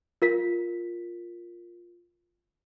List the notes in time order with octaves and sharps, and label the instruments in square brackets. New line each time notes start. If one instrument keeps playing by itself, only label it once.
[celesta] F4 A#4 B6